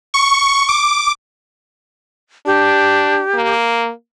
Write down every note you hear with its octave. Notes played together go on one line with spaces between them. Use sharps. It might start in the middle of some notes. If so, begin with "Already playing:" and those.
C#6
D6
D4 G4
A#3